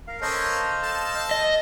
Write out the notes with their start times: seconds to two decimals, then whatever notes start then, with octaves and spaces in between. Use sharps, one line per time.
0.08 A#4 F5
0.22 C#4 A4 A#4 C5 D#5 F5
0.83 A4 A5
1.31 D#5